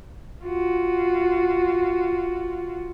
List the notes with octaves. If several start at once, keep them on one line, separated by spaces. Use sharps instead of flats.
F4 F#4